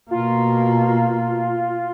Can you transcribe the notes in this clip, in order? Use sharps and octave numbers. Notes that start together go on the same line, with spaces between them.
B2 A#3 F4